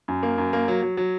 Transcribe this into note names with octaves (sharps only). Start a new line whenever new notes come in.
F#2
A#3
F#2
A#3
F#3
F#3
F#3